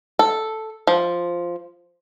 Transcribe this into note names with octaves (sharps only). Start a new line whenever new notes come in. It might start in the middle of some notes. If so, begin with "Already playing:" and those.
A4
F3